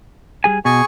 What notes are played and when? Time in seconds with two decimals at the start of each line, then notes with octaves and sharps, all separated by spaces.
0.44 G3 G#4 G#5
0.65 B2 G#4 G#5 C#6